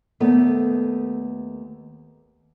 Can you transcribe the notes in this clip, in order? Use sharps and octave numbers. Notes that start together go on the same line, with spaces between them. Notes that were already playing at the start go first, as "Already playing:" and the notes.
D#2 A3 B3